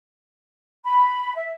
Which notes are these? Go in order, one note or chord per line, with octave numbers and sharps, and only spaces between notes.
B5
E5